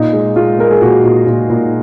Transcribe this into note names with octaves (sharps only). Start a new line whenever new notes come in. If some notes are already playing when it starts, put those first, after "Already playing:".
Already playing: A#2 D#4
G#3
G#3 F4
G#3 A#4
G#4
A#2 F#4
A#2
A#2
A#2